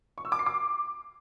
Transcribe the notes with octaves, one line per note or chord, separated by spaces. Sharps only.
C#6
E6
D6
C7
D6